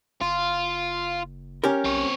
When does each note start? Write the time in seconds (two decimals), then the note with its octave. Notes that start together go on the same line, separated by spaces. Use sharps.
0.21 F#1 F4
1.64 C#4 G4 A#4
1.85 B1 C4 C#5